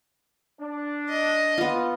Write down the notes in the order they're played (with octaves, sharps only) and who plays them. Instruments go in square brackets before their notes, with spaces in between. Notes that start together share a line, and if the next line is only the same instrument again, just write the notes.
[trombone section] D4
[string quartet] D#5
[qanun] B3 F4